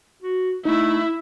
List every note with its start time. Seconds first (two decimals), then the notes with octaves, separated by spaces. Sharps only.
0.22 F#4
0.65 A3 D#4 E4